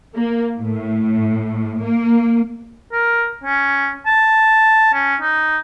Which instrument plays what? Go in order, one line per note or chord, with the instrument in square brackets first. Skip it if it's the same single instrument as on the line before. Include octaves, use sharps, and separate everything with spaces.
[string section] A#3
A2
A#3
[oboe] A#4
C#4
A5
C#4
D#4